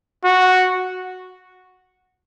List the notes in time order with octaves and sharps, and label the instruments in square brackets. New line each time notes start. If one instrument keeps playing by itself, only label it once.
[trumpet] F#4